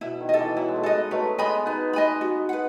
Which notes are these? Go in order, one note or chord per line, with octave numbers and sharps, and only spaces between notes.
B2 E4
D#3
A4 D#5
E3
F#3 E4
G#3
A3
G#3 B3 A4 D#5
F#3 A3 B4
G#3 B3 D#5 G#5 B5
B3 D#4 B4
D#5 G#5 B5
F#4
B4 F#5